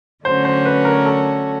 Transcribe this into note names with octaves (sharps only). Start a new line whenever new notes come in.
D3 F#3 A3 C#4 F#4 C5
C5
B4
A#4
A4